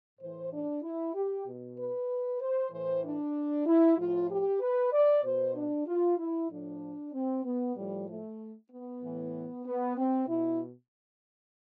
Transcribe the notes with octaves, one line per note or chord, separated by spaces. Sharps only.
A2 E3 C5
D4
E4
G4
B2
B4
C5
A2 E3 C5
D4
E4
A2 F3 F4
G4
B4
D5
B2 C5
D4
F4
E4
A2 F3 D4
C4
B3
A2 F3 G3
A3
B3
A2 E3
B3
C4
B2 E4